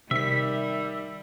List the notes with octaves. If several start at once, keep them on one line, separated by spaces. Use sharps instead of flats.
C3 D#3 G3 E5 B6